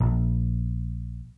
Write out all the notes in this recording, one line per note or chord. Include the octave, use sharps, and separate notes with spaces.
A#1